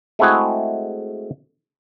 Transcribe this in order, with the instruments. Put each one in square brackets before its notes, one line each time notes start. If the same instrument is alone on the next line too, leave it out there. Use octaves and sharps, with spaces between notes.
[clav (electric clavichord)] G#3 A3 C4 E4 F#4 G#4